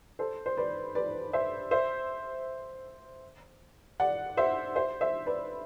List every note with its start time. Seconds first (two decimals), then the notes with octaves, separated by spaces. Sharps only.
0.19 A4 C5
0.46 C5
0.57 B4 D5
0.95 B4 D5
1.33 C5 E5
1.71 C5 E5
4.00 D5 F#5
4.37 C5 E5
4.76 C5 E5
5.01 C5 E5
5.26 B4 D5